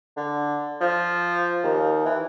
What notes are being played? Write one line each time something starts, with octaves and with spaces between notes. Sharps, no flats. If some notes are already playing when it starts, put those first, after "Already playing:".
D3
F3
D#2
E3